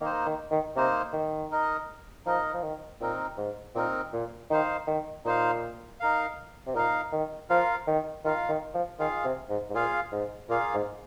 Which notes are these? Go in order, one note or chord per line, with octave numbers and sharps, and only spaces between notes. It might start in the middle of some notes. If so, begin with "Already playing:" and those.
D#3 A#3 D#4 C5
D#3
D#3
C3 A#3 D#4 C5
D#3
D#4 A#4 D#5
F3 D#4 A#4 D#5
F3
D#3
A#2 C4 D#4 A#4
G#2
A#2 C4 D#4 A#4
A#2
D#3 D#4 C5 F5
D#3
A#2 D#4 C5 F5
D#4 A#4 F5
C3
A#2 D#4 A#4 F5
D#3
F3 F4 A#4 F5
D#3
D#3 F4 A#4 F5
D#3
F3
D#3 F4 G#4 F5
C3
G#2
G#2
A#2 F4 G#4 F5
G#2
A#2 A#3 F4 G#4 F5
G#2